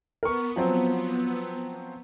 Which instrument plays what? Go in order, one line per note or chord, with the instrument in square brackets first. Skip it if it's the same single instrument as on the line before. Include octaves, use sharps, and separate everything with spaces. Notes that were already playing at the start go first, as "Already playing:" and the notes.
[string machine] B3 [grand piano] A#4 C#6
[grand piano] F3 F#3 C4